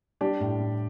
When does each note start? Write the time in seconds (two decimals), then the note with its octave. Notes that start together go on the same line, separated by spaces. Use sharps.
0.21 G3 D4 G4
0.40 A2
0.60 A2